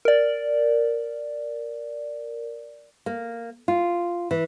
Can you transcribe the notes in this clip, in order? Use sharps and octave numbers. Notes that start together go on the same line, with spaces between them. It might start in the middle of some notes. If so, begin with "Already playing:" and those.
A#4 D5
A#3
F4
E3